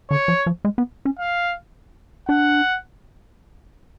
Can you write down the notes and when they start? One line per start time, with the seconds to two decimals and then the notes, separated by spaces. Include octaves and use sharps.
0.10 D3 C#5
0.28 F3
0.46 F3
0.65 G#3
0.78 B3
1.05 C#4
1.19 F5
2.28 D4 F#5